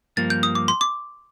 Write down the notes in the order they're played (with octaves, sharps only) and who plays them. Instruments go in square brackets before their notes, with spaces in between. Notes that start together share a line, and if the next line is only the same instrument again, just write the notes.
[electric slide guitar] G2 F3 A#3 [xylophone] A6
[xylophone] G6
D#6
D6
C6
D6